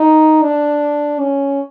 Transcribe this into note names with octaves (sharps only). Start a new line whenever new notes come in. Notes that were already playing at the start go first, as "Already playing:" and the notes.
Already playing: D#4
D4
C#4